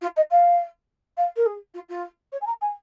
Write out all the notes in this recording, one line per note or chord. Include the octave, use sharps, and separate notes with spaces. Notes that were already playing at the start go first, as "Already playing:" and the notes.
F4
D#5
F5
F5
A#4
G#4
F4
F4
C#5
G#5
A#5
G#5